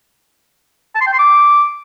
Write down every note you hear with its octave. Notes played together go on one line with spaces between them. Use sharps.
A5
C6
G5
C6
D6